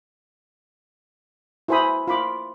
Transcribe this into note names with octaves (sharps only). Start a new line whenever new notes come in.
E4 F#4 C5 G#5 B5 D#6
F4 B5 D6